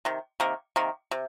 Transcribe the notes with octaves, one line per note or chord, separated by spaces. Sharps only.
C3 D#3
C3 D#3 A#3
C3 D#3 A#3
C3